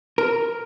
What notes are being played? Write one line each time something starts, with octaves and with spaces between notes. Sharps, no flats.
A#4